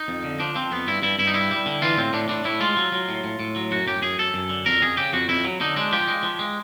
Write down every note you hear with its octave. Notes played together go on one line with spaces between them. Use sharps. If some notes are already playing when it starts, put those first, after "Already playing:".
Already playing: D#4
F2
D3
F3 D4
F3 C4
F2 B3
G2 E4
G2 E4
G2 E4
D#4
G3 E4
G3
D3
E3 F4
A2 C4
A2 D4
A2 D4
A2 E4
G#3 F4
F#3
F#3
A2
A2
A2
F#3
F#2 F#4
F#2 G4
F#2 G#4
F#2 A4
F#2
D3
F2 A#4
F2 G#4
C#3 G4
F2 F#4
F2 E4
F#3
D3 D#4
G#3 D4
F3 G4
G#3
F3
G#3